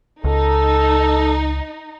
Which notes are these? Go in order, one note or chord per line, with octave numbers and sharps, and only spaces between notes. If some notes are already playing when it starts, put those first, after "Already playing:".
C#2 D#4 A4